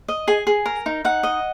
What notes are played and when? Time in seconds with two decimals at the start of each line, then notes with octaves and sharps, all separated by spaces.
0.08 D#5
0.28 G#4 G#5
0.47 G#4
0.66 A#4
0.86 D#4
1.05 D#4 F#5
1.23 D#5